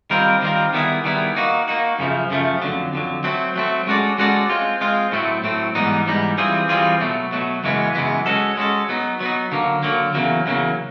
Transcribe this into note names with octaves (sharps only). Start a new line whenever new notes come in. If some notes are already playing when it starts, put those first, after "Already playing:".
D#3 G3 C4 F4 A#4
D#3 G3 C4 F4 A#4
D#3 G3 B3 E4 G#4
D#3 G3 B3 E4 G#4
A#3 D#4 F#4
A#3 D#4 F#4
F#2 C#3 F3 A3
F#2 C#3 F3 A3
F2 D3 F#3
F2 D3 F#3
F#3 A3 C4
F#3 A3 C4
G#3 C#4 F#4 A4 D5
G#3 C#4 F#4 A4 D5
G#3 C4 F4
G#3 C4 F4
A2 F#3 A3 C4
A2 F#3 A3 C4
G#2 E3 G3 B3 D#4
G#2 E3 G3 B3 D#4
E3 G3 C4 F4 G#4
E3 G3 C4 F4 G#4
B2 F#3 A3
B2 F#3 A3
F#2 C#3 E3 G#3 B3
F#2 C#3 E3 G#3 B3
G#3 C#4 F#4 A4
G#3 C#4 F#4 A4
F#3 B3 D#4
F#3 B3 D#4
D3 F#3 A#3
D3 F#3 A#3
E2 C#3 F#3 A#3
E2 C#3 F#3 A#3